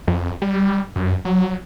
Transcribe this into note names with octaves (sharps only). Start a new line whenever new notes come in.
F2
G3
F#2
F#3